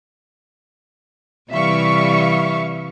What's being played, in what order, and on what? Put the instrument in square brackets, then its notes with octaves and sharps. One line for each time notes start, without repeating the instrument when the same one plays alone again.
[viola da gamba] C3 E3 G3 [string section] E5 F5 C#6